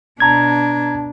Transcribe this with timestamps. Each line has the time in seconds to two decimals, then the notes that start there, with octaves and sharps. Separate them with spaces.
0.20 B2 D4 A5 A#5 G#6